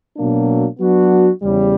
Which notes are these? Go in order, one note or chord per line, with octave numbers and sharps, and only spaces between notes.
B2 F#3 A#3 D4
F#3 B3 D4 F#4
E2 C#3 G3